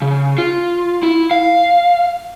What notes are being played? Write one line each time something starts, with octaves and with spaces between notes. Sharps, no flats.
C#3
F4
E4
F5